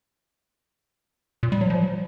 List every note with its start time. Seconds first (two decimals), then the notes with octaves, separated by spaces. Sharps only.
1.43 A#2
1.52 G3
1.61 F#3
1.70 F3